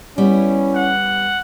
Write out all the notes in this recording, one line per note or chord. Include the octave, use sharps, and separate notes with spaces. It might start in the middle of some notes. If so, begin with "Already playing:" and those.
G3 B3 C#4 E4
F#5